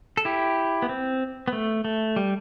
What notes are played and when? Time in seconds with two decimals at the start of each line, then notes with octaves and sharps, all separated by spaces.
0.17 A4
0.25 E4 G4
0.82 B3
0.89 C4
1.48 B3
1.53 A3
1.85 A3
2.16 G3